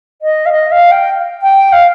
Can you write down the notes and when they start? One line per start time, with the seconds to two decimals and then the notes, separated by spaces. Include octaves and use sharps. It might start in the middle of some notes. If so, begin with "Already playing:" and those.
0.22 D#5
0.46 F5
0.52 D#5
0.72 F5
0.91 G5
1.42 G5
1.72 F5